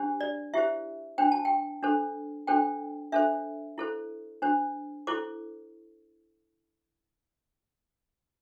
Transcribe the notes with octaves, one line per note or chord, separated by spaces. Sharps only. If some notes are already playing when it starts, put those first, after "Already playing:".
Already playing: D4 G4 C5
D5
E4 G4 C5 E5
D4 C5 G5
A5
G5
D4 A4 C5
D4 A4 C5 G5
D4 A4 C5 E5
E4 A4 C5
D4 C5
E4 A4 C5 D6